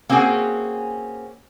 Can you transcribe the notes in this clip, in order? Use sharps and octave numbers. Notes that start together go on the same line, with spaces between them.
A#3 C4 C#4 F#4 G#4